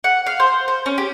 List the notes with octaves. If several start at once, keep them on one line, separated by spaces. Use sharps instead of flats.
F#5
F5
C5
C5
C#4
G4